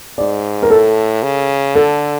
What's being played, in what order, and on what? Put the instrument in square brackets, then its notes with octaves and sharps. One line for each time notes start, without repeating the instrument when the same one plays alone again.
[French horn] G#2 [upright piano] D5
[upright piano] A#4
[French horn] A2 [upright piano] A4
[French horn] C#3
[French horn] D3 [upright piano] A4